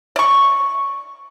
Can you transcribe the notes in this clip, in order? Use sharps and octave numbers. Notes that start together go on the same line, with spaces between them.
D5 C#6